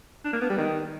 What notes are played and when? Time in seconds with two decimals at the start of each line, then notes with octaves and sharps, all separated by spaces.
0.25 D4
0.33 A#3
0.41 B3
0.50 G3
0.58 D#3